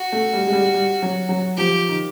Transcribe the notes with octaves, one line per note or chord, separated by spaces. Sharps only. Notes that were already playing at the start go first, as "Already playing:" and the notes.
Already playing: F#4
A3
G3
G#3
G3
G3
F#3
F#3
F3 G4
D#3